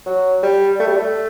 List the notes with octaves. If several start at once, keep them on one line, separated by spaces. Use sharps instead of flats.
F#3
G3
A3
G3
A3